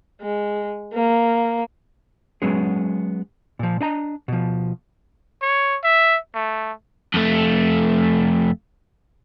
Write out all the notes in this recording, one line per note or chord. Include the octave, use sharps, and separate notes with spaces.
G#3
A#3
F#3 G#3 B3 C#4 G#4
A#2 F3
D4 D#5 A#5
B2 F3
C#5
E5
A3
F2 A3